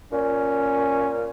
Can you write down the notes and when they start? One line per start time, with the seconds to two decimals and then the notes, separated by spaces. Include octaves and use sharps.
0.12 A#2 C#4